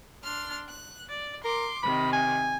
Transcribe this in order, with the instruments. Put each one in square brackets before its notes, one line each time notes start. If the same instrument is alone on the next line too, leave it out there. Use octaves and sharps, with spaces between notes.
[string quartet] D4 C6 F6
F#6
D5
[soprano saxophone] A#4 [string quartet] C6 D6
[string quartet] C3 D#3 [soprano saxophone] B5
[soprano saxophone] G#5